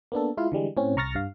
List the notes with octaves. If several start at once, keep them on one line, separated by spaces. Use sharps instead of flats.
A#3 B3 D4 A4
G#3 E4 F4 F5
D3 E3 G3 G#3
A2 C4 C#4
C2 A#5 C#6 F6 A6 A#6
G2 F5